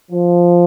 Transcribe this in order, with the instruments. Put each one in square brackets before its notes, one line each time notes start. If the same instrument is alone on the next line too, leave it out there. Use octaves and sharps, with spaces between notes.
[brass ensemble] F3